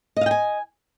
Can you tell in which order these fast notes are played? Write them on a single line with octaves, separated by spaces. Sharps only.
D#5 F5 G5 G#5